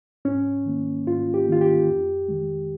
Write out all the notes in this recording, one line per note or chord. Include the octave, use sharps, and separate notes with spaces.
G#2 C#4
D#3 A#3
G#2 F4
G4
D#3 A#3 F4
G4
F2
D#3 G#3